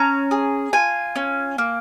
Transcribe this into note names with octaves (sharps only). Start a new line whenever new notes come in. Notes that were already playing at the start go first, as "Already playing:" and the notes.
Already playing: C#4 A#5
G#4
F4 G#5
C#4
A#3